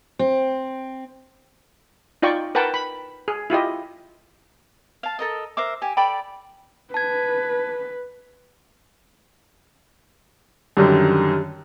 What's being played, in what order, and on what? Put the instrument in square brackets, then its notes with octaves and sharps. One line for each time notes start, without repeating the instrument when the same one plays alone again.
[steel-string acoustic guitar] C4
[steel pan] D#4 F4 D5 G5 C#6
A#4 B4 F#5 G5 A5
B5
G#4
E4 F4 G4 D#5
[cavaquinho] F5 A5
A4 A#4 D#5
A#4 C5 E5 D6
G4 G#5
A4 D5 G5 B5
[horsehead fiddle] B4 [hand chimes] A5 G#6
[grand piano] F#2 D3 D#3 [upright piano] G3